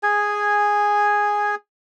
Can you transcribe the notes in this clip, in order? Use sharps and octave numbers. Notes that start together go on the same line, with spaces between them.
G#4 G#5